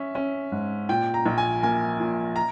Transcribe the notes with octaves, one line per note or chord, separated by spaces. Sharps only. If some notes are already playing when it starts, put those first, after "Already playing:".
Already playing: C#4 E5
C#4
G#2
A#2 G5
A#5
A#1
G#5
A#3 G#5
A#2
A#5